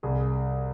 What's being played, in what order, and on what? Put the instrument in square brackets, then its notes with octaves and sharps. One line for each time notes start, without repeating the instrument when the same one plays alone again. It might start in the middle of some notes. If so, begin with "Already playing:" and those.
[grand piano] C2 G#4